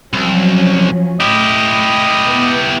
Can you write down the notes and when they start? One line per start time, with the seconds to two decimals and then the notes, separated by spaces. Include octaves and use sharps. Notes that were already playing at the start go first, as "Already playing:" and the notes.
0.13 C2 F3 F#3 C#4
1.21 A2 E4 G4 D#5
2.29 B3 B4